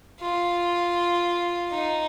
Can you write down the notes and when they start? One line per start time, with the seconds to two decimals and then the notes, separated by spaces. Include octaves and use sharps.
0.20 F4
1.71 D#4